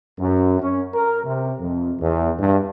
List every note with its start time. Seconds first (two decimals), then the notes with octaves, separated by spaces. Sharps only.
0.20 F#2
0.61 C#4
0.94 A#4
1.26 C3
1.60 F2
2.01 E2
2.40 G2